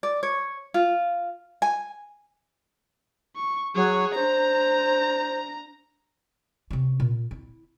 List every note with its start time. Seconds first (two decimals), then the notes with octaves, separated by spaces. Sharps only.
0.03 D5
0.23 C#5
0.74 F4
1.62 G#5
3.36 C#6
3.75 F#3 G#4 C#5
4.15 D4 C5 A#5
6.71 C3 C#4
7.00 A#2
7.31 E4